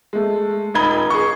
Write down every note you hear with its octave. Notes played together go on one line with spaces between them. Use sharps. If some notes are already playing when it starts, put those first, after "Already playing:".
G#3 A3
D#1 D#4 B5 G#6 G7
G#4 C#6